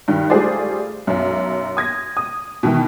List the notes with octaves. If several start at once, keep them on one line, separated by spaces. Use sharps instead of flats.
G2 D#3
G3 A3 F4 G#4 C5 D5
B1 F#2
D#6 G#6 A#6
D#6
B2 D#3 E3